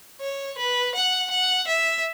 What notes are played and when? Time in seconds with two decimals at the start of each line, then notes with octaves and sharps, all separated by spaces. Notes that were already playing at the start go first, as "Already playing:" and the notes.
0.21 C#5
0.58 B4
0.95 F#5
1.31 F#5
1.67 E5